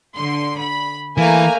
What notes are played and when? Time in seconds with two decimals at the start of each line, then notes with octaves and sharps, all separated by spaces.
0.15 D3 C6
0.57 B5
1.17 E3 A3 A#3 G#5 A#5